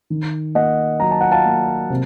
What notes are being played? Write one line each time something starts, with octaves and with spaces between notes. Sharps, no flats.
D#3
A#3 D#5 F#5
F#3 A#5
A5
F#5
F5 A5
A#3
C3